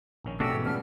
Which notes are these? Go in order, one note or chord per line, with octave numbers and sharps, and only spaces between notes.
A#1 D#3 C#4
B2 A3 D4 F#4 G4 E6
G#2 E3 C#4
A#2 C#3 G3 B3 A5 F6